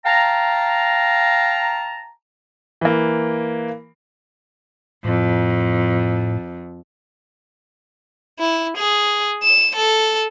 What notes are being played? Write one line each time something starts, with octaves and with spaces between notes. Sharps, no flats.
F5 G5 A5 A#5
E3 A#3
F2 A2
E4
G#4
E7
A4